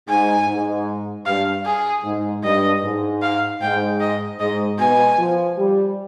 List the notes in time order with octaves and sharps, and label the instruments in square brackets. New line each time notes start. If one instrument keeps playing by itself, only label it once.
[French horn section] G#2 [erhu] G#5
[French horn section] G#2
[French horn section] G2 [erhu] F5
[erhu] G#4
[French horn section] G#2
[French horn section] G2 [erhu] D#5
[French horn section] G#2
[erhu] F5
[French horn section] G#2 [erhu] G5
[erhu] D#5
[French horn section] G#2 [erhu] D#5
[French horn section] B2 [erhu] G#5
[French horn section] F3
G3